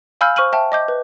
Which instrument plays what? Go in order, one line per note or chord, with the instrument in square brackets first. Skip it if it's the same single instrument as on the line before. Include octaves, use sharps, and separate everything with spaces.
[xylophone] F5 G#5 B5 E6 F6 G6
C5 C#6 F6 D#7 F#7
E5 G5 A5
D#5 D6 G6
B4